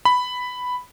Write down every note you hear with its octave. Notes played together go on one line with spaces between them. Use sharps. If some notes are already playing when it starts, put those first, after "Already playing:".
B5